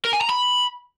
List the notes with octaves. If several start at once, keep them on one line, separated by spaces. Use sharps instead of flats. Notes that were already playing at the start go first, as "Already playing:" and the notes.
A#4
G#5
A#5
B5